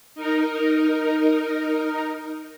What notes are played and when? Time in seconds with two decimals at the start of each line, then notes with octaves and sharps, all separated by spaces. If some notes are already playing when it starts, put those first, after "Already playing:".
0.15 D#4 A#4